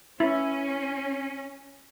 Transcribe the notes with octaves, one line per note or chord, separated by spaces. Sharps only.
C#4 E4